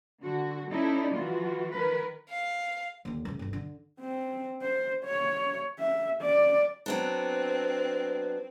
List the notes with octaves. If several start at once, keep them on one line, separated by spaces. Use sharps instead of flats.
D3 F#4
C#4 D#4 E4 A4 D5
E3 F3 F4 F#4
D#3 A#4 B4
F5
D#2 D3
C#3 B3
G1 D2
D3
C4
C5
C#5
E5
D5
F#3 B3 C4 D4